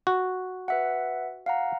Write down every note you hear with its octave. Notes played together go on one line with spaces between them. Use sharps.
F#4
B4 E5 F#5
F5 F#5 A#5